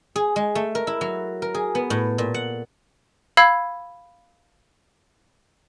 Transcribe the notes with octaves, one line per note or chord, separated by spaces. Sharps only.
G#4
G#3
A3
A#4
E4
F#3
A#4
G#4
B3
A2
A#2
F#5
F5 B5 E6 G#6